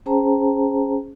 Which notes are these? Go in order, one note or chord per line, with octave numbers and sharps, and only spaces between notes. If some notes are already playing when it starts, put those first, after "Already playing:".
C#4 G#4 C5 G5 A5 A#5